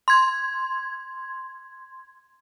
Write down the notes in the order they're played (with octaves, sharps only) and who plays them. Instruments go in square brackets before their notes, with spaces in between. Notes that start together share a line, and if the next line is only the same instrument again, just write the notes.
[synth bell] C6 G#6